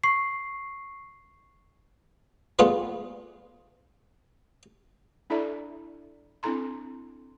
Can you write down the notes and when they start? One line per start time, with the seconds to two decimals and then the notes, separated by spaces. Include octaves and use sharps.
0.04 C#6 C7
2.59 G3 A3 B3 F4 G#4 B4
5.30 D4 E4 A4 D5 E5 A#5
6.43 C4 D4 E4 A4 A#5 C6